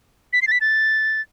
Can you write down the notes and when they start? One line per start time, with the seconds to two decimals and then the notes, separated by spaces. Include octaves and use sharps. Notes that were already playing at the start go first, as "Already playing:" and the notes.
0.33 B6
0.42 C7
0.47 A6
0.52 B6
0.61 A6